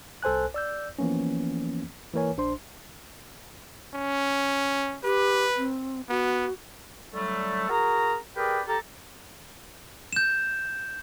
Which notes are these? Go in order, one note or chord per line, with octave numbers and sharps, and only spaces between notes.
C2 A4 C5 G#5 F#6
D5 E6 G6
E3 F3 A#3 B3 C#4
E3 A#3 A#4 C#5 G#5
A#1 D4 C5 C6
C#4
G4 B4
C4
B3 F#4
D3 F#3 G3 A3
F#4 G#4 A#4 A#5
G4 G#4 A#4 B4 D5 G5
G4 A4 A#5
G6 E7